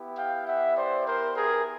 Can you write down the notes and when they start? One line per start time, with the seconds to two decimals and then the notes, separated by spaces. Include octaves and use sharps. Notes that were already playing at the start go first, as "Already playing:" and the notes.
Already playing: B3 E4 G4
0.16 F5 G5
0.46 E5 F#5
0.76 C5 D5
1.05 A#4 C5
1.35 G#4 A#4